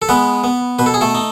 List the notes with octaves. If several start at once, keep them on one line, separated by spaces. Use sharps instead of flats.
A4
G#3 B3 B4
B3
B2 B4
A4
G#4
A3 A4
D#4